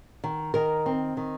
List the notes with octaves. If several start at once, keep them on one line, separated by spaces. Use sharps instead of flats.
D#3
D#3 A#4
C4
D#3